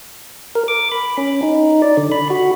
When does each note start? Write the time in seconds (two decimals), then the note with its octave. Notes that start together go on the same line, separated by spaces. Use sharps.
0.55 A#4
0.68 D6
0.92 B5
1.18 C#4
1.43 D#4
1.82 D5
1.97 D3
2.12 B5
2.30 F#4